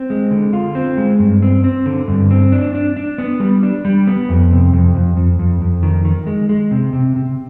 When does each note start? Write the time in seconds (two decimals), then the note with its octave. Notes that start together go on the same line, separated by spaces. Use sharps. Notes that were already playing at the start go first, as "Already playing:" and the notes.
Already playing: C4
0.10 G#3
0.31 D3
0.53 F4
0.75 C4
0.97 G#3
1.19 G2
1.42 C4
1.64 C4
1.86 D3
2.08 G2
2.31 C4
2.52 D4
2.75 D4
2.97 D4
3.18 B3
3.40 G3
3.63 D4
3.85 G3
4.07 B3
4.29 F2
4.51 C3
4.73 F2
4.95 F2
5.17 F2
5.39 F2
5.62 F2
5.83 D#3
6.05 D#3
6.27 G#3
6.49 G#3
6.71 C3
6.93 C3
7.16 C3